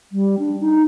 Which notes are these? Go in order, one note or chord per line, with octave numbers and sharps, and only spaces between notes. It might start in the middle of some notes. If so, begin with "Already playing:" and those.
G3
D4
D#4